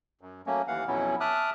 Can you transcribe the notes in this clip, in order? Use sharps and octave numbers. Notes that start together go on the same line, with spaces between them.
F#2
F#3 A3 A#3 C#4
D#2 E3 F5 F#5
F2 B2 F#3 B3 C#4 E4
E5 A5 D6 D#6 F6 F#6